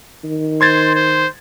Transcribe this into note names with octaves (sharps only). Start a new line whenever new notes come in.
D#3
C5 C6 G#6 A6
C5